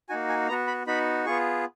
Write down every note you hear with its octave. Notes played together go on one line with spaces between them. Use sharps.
A#3 D#4 F#4 G#5
G#5
B3 F#4 A#5
B5
B3 D#4 F#4 B5
B3 F4 G#4 C#6